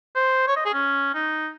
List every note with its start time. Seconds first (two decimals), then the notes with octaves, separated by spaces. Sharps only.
0.15 C5
0.48 C#5
0.56 D#5
0.65 G#4
0.73 C#4
1.14 D#4